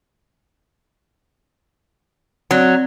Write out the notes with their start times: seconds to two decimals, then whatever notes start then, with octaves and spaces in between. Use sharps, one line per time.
2.51 F#3 C4 D5